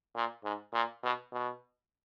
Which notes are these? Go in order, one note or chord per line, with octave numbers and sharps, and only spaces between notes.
A#2
G#2
A#2
B2
B2